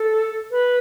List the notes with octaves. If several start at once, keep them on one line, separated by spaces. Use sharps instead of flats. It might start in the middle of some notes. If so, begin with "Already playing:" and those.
Already playing: A4
B4